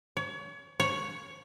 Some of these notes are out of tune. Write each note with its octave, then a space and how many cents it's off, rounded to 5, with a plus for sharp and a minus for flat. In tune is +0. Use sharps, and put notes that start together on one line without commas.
C#5 +30
C#5 +0